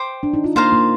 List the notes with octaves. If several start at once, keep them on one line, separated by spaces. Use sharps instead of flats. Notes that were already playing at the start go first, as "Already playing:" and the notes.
Already playing: C5 G5 D6
D4
D#4
F4
A#3 F4 C5 F5 A#5
A#3